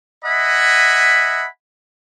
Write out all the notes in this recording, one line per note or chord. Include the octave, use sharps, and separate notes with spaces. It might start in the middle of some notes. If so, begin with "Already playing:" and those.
D#5 E5 F#5 G#5 B5